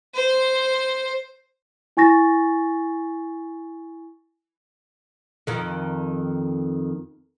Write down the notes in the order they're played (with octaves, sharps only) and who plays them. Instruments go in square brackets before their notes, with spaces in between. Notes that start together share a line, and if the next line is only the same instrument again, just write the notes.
[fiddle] C5
[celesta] E4 G#5 C#6 A6 A#6
[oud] F2 D#3